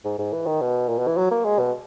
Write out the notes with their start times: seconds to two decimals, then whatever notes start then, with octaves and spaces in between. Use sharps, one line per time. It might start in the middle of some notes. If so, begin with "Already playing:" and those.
0.05 G#2
0.19 G#2
0.33 E3
0.47 D#3
0.61 B2
0.89 A#2
0.99 B2
1.07 E3
1.18 F#3
1.31 A#3
1.45 G#3
1.59 B2